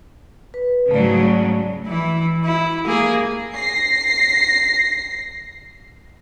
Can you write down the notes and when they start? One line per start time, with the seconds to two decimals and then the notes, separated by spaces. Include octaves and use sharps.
0.54 B4
0.91 G#2 C#3 F#3 A3 D5
1.86 E3 E4
2.44 E4
2.85 A#3 G#4
3.55 A#6 C7